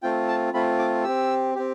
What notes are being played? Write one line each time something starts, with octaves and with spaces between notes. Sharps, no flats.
A3 C4 F4 G5
A5
A3 C4 F4 B5
D6
C4 G4 E6
C4 G4